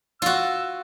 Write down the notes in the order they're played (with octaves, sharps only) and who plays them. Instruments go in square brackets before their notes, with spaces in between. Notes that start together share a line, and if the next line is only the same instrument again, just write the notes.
[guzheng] F4 F#4 [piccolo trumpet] E6